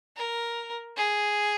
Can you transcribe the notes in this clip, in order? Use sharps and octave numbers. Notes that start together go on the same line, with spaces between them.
A#4
G#4